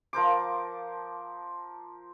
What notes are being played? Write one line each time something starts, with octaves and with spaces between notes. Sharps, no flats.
F3 A#4 C5 D6